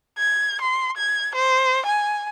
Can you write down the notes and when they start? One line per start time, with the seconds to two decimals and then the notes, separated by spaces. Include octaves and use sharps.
0.18 G#6
0.61 C6
0.97 G#6
1.35 C5
1.86 G#5